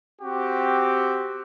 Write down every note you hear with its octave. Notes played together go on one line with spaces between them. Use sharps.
C4 F#4 G4